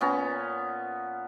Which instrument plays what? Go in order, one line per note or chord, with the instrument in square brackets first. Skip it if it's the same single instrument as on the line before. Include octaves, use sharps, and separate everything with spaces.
[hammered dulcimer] A#2 B3 C#4 A#5